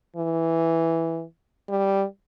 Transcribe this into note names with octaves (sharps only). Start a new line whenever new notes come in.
E3
G3